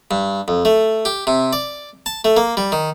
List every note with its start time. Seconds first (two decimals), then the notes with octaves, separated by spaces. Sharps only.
0.11 G2
0.48 F2
0.65 A3
1.05 G4
1.27 C3
1.53 D5
2.06 A5
2.25 A3
2.37 A#3
2.57 G3
2.72 D#3